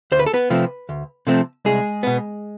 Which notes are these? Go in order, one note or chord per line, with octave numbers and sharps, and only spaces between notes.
D2 C5
B4
A4
B3 B4
C3 F3 A3 C4
D2
C3 F3 A3 C4
C2 G#3 G#4
B2 B3